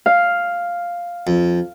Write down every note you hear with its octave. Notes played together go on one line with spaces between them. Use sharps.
F5
F2